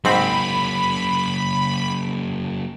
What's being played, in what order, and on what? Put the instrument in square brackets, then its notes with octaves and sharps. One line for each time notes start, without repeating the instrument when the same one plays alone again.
[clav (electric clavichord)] G#2 C4 [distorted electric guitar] F#3 A#3 [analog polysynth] B5